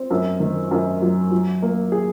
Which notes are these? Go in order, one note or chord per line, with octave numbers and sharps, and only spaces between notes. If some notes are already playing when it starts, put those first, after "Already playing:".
Already playing: C4
F#2
D#3
F#2
F#3
F#3
A#3
G#4